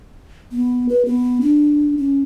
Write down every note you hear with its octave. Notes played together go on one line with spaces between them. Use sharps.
B3
B4
B3
D4
C#4